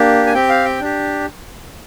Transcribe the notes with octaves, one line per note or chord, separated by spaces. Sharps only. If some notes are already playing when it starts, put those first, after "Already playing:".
Already playing: A#3 D4 G4
G#5
C4 G4 G5
F5
G5
D4 G4